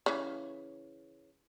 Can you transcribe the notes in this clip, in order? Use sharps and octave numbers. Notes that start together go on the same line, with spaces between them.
C#3 E3